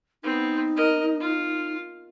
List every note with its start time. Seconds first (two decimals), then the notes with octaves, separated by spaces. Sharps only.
0.23 B3 C4 D#4
0.76 A#4 D#5
1.20 F4